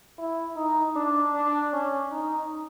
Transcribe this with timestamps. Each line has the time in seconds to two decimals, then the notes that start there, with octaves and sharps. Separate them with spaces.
0.18 E4
0.57 D#4
0.96 D4
1.34 D4
1.73 C#4
2.12 D#4